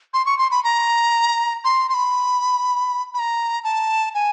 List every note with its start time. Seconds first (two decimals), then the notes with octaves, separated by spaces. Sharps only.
0.14 C6
0.26 C#6
0.38 C6
0.51 B5
0.64 A#5
1.64 C6
1.89 C6
1.94 B5
3.14 B5
3.19 A#5
3.64 A5
4.14 G#5